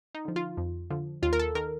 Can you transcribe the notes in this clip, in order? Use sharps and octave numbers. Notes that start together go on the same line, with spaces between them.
D#4
D3 F3
F4
F2
D3 F3
D#2 F4
A#4
A4
D#3 A#4